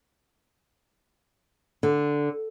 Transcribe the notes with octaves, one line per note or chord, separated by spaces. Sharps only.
D3